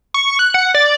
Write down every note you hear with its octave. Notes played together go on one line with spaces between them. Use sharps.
C#6
F#6
F#5
D5